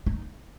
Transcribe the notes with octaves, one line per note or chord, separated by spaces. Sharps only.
D#4